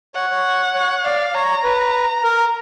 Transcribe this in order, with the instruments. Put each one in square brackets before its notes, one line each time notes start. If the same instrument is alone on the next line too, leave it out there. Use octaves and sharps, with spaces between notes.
[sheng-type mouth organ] C#5 [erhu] F#5
[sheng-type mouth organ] C#5
C#5
[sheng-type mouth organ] D5 [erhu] F5
[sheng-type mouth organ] C#5 [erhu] A#5
[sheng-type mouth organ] B4
A#4